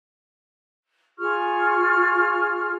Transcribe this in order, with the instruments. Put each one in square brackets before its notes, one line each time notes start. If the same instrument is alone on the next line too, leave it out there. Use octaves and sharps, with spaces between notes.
[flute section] F4 G#4 C#6 F6